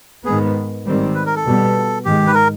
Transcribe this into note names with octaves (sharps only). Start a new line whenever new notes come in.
G#2 D#3 G#3 B3 G#4
G#2 D#3 G3 C4
B4
A#4
A4
B2 G3 B3
G#2 D#3 G#3 G4
B4
A#4